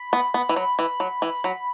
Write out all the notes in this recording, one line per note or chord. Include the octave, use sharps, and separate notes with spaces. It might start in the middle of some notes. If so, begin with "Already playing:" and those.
Already playing: B5
B3
B3
E3
F#3
E3
F#3
E3
F#3 B5